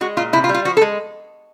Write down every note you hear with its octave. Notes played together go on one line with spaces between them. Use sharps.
G#3 F#4
A#2 F4
C3 E4
F4
G3
F4
F3 F#4
A4
G#3